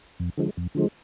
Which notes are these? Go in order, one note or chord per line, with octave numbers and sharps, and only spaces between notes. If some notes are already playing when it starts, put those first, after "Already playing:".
F2
D3 F3 G#3
F2
D3 F3 G#3